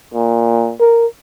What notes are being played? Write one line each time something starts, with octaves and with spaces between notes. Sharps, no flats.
A#2
A#4